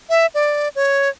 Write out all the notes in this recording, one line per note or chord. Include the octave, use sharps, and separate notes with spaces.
E5
D5
C#5